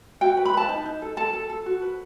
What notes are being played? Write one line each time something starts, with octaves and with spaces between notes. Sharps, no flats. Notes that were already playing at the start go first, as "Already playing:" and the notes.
F#4 G5
B4
B5
B4 A5
D#4
D#4
A4
A4 A5
A4
A4
F#4
B4